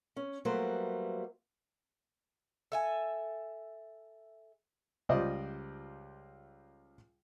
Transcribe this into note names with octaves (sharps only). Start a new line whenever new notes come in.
C#4
F#3 G3 A3 A#3 B4 C5
A4 E5 G#5
C#2 G3 F4 C5 D5 D#5